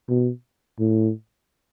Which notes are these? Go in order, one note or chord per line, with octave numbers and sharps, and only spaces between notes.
B2
A2